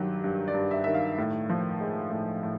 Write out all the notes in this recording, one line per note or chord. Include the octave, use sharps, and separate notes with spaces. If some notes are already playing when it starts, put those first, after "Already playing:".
Already playing: G2 D#3 F#3 G4
G2
D5
G2
E5
D#3 E5
F5
A2
F3
G#3
A2
A2